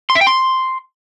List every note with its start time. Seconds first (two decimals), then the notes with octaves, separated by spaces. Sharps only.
0.10 C6
0.15 E5
0.21 G5
0.27 C6